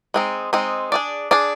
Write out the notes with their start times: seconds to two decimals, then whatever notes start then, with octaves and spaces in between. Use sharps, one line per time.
0.14 G#3 C4 D#4
0.53 G#3 C4 D#4
0.92 D4 G#4 D5
1.31 D4 G#4 D5